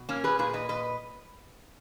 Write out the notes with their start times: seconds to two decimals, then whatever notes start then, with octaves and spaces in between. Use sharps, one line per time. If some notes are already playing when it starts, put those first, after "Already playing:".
Already playing: B2
0.09 A#3 C#4
0.24 G#4 B4
0.39 A#2 G#4 B4
0.53 B4 D#5
0.69 B4 D#5